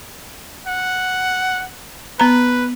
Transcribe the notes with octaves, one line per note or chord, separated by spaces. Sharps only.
F#5
B3 B4 A#5